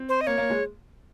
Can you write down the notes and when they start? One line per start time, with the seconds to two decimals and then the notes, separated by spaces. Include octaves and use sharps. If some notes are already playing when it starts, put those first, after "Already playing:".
Already playing: C4
0.09 C5
0.21 D#5
0.27 A#3 C#5
0.38 A#3
0.50 G#3